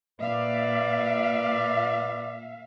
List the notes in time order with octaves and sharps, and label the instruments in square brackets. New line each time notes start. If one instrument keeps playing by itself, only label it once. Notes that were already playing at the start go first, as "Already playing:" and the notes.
[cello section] A#2 E5 F5 [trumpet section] B4 D5